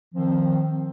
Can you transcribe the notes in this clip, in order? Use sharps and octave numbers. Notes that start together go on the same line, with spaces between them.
D#3 F3 C4